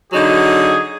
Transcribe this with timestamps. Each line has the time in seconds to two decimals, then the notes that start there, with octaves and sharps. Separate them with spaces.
0.13 D3 F#3 D#4 G#4